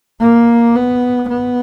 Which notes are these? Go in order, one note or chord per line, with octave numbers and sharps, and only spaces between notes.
A#3
B3
B3